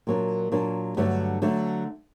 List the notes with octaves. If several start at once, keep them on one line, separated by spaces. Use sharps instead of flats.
A#2 F#3 A#3 D4
A#2 F#3 A#3 D4
G2 D3 F#3 A3
D3 F#3 A3